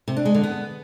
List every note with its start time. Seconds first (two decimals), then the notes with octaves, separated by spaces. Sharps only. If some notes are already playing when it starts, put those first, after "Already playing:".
0.08 C3
0.17 D4
0.25 G#3
0.34 D3
0.43 B3